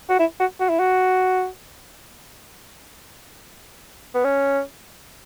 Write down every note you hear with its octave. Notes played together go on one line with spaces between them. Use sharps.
F#4
E4
F#4
F#4
E4
F#4
B3
C#4